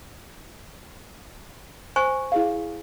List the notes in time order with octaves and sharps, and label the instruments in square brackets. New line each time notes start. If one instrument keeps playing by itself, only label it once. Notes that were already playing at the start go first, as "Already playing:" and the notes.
[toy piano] C5 G#5 C#6
[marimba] E4 G#4 F5